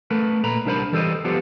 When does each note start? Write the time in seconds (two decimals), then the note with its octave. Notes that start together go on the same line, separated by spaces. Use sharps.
0.10 A3 A#4 B4
0.44 A#2 B4 A#5 B5
0.65 C2 D4 A#4 C5 B5
0.92 E3 G3 A4 C5 D#5
1.24 F3 G3 B3 G4 A4 C5